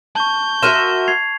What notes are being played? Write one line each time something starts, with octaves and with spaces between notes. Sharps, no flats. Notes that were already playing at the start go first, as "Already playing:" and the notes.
A5 C#6 G6
F#4 A#4 E5 C6 F6 D#7
G#6 C7 F7